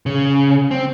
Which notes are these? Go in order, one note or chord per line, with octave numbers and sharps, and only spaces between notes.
C#3
C4